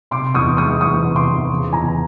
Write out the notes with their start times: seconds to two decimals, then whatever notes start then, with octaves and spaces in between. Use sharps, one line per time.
0.11 C3 C6 D6
0.34 E2 C#6 D#6
0.57 G#3 C#6 D#6
0.81 E3 C#6 D#6
1.04 C3
1.16 C6 D6
1.28 E2
1.50 C#3
1.72 E2 G#5 A#5